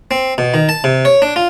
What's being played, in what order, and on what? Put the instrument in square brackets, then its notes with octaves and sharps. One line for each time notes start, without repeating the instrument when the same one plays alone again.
[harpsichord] C4
B2
D#3
A5
C3
C#5
D4
F4